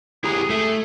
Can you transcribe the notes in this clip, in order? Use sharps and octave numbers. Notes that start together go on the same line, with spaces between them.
E4 G4 G#4 A#5
A3 E5